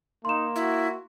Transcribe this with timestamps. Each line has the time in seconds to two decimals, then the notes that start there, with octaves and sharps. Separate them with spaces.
0.25 A#3 D#4 C6 E7
0.56 E4 F#4